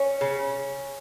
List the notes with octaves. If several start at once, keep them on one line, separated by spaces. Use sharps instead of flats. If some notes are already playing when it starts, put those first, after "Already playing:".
Already playing: C#4
C#3